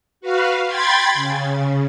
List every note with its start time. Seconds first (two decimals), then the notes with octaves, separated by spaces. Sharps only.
0.21 F#4 B4 F5
0.66 G5 B5 C6 G#6 A6
1.14 C#3